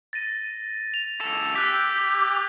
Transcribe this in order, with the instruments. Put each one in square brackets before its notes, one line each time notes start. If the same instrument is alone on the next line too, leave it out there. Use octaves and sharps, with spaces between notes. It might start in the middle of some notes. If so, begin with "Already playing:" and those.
[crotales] A6 A#6 D#7
F7
[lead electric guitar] C#2 A4
[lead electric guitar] G4 [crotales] E6 F#6 B6